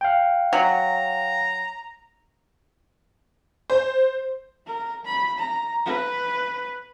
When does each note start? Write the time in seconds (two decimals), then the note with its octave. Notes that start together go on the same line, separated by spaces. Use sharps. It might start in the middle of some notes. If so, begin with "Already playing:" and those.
0.01 F5 G5
0.53 F#3 A#5
3.70 C5
4.67 A#4
5.06 B5
5.39 A#5
5.86 B4